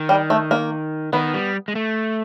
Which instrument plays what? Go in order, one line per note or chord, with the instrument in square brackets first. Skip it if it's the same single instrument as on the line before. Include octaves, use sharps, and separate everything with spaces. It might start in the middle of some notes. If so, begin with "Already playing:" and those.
Already playing: [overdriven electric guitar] D#3
[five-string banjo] G3
A3
A#3
[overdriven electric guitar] D#3 [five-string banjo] B3
[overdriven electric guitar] G3
G#3
A3